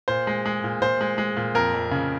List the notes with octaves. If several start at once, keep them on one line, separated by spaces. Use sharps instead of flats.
A#2 C5
G#3
G#3
A#2
A#2 C5
G#3
G#3
A#2
F2 A#4
F2
C#3